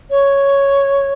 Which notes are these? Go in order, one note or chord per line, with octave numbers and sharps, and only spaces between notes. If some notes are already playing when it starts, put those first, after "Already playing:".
C#5